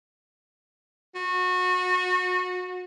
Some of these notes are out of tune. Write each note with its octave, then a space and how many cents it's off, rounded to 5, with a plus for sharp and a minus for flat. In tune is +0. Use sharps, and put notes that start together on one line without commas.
F#4 -25